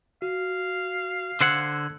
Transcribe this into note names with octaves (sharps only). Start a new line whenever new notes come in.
F#4 F5
D3 C5 F#5 E6 F#6 G#6